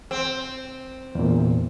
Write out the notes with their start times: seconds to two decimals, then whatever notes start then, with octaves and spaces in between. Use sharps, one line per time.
0.11 C4
1.15 E2 A#2